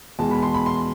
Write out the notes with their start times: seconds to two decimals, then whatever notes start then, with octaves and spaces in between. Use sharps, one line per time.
0.19 E2 B2 G#3 A5
0.31 B5
0.43 C6
0.54 B5
0.66 C6